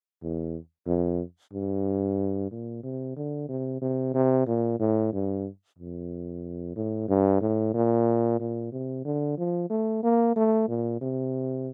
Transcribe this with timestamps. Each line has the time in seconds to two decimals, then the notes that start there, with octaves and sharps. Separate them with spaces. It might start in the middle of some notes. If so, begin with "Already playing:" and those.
0.23 E2
0.87 F2
1.53 G2
2.52 A#2
2.84 C3
3.17 D3
3.49 C3
3.82 C3
4.14 C3
4.47 A#2
4.80 A2
5.13 G2
5.78 F2
6.76 A2
7.09 G2
7.41 A2
7.74 A#2
8.40 A#2
8.72 C3
9.05 D3
9.38 F3
9.70 A3
10.03 A#3
10.36 A3
10.68 A#2
11.01 C3